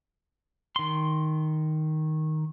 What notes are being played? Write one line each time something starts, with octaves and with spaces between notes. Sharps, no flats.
D#3 C6